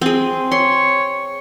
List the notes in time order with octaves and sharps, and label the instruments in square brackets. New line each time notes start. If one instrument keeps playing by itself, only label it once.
[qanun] C4 G#4
[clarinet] C#5 [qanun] C6